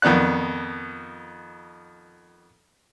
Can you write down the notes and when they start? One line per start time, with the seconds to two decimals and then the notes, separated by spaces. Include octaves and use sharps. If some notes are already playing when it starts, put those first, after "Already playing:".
0.02 F2 D#3 B3 D5 F#6